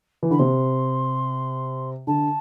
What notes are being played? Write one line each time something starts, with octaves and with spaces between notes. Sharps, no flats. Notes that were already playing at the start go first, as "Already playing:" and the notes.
E3
D3 B5
C3 C6
D3 A5